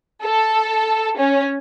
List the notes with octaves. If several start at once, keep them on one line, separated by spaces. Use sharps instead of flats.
A4
C#4